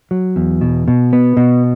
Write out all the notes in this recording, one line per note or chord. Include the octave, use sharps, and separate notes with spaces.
F#3
E2
B2
B2
B3
B2